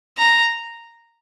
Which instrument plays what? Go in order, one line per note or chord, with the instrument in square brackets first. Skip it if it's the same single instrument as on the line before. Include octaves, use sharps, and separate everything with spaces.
[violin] A#5